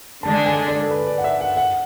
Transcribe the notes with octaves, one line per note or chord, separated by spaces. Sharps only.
D3 G#3 D4 A5
G#5
D5
A4
B4
D5
F#5
E5
F#5
F#5